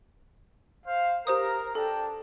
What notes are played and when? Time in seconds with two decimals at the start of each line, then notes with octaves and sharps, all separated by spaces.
0.87 C5 F5
1.27 G4 A#4 C5 D#6
1.75 D4 A4 G5 A5